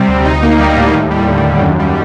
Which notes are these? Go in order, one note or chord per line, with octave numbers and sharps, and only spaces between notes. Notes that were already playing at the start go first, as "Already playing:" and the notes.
Already playing: C3 G3 C4
D2
D#4
A#3
G3
A2
D#2
G3
D3
D#2
F#2
G3